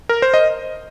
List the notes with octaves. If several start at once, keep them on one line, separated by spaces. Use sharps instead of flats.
A#4
C5
D#5